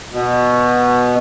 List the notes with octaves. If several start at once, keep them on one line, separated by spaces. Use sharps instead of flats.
B2